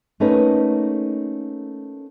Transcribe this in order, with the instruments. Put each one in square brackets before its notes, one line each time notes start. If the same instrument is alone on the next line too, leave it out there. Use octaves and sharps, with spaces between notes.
[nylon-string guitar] A3 A#3 C#4 D#4 B4